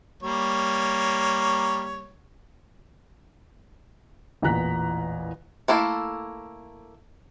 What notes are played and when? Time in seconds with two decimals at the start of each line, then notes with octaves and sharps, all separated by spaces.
0.23 G3 A#3 C#5
4.42 A1 E2 A#2 A#5 F#6 B6
5.68 A3 A#3 E4 A4